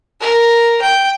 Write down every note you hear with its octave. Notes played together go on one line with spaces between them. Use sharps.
A#4
G5